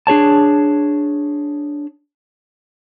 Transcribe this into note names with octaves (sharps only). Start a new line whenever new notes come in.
D4 G#4 C#5 A5